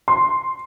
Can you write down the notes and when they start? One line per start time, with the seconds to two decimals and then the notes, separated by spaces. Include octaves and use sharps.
0.08 C6